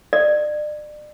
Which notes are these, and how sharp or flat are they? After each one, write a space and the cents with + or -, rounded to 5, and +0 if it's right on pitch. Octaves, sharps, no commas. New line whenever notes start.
D5 +35